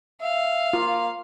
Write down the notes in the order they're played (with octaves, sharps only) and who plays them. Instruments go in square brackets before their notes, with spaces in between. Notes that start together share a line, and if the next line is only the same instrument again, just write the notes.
[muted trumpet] E5 [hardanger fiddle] F5
[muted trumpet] A#3 [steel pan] F4